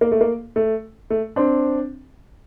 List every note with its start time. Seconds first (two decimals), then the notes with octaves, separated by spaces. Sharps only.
0.01 A#3
0.12 A3
0.21 A#3
0.56 A3
1.10 A3
1.36 C4 D4